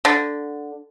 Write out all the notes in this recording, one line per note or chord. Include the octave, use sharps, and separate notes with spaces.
D3